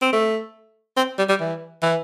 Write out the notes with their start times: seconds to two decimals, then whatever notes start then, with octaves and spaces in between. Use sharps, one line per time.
0.02 C4
0.13 A3
0.97 C4
1.18 G3
1.29 G3
1.40 E3
1.83 E3